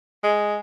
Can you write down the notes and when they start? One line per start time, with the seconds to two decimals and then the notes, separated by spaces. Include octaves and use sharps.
0.23 G#3